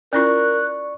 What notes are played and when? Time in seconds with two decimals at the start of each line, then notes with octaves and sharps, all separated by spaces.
0.13 C#4 E4 F4 A#4 D5 C#6 F#6